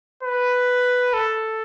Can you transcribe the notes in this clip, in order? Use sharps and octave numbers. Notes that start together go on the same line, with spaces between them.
B4
A4